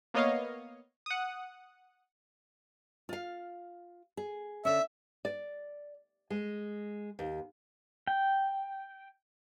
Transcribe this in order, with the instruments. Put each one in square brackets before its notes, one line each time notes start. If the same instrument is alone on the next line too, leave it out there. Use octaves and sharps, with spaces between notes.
[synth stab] A#3 B3 C#5 D#5 F5
F#5 D#6
[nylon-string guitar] F4 F5
G#4
[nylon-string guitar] D3 C#4 [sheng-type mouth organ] E5
[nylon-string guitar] D5
G#3
D#2
[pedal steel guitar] G5